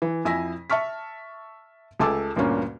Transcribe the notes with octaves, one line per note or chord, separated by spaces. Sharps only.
E3
F2 E4 G#5 E6 A#6 B6
E5 A5 C#6 F6 B6
C#2 A3 G#5 A5 D6 E6
D2 G2 A#2 A#3 C#4